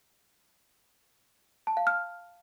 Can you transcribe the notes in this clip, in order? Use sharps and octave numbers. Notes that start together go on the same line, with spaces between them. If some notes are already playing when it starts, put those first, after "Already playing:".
A5
F5
F6